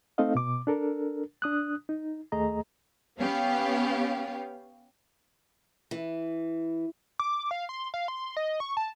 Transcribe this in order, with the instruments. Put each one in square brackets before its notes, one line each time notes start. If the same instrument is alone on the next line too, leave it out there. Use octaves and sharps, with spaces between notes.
[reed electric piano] A3 C4 D#4 A4 D#5 F5
B2 D6
D4 A4 A#4
D4 D#6 F#6
D#4
D#2 A3 G#4 D#5 A#5
[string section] B3 C#4 G4 F5
[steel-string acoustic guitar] E3
[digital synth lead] D6
F5
C6
F5
C6
D#5
C#6
A5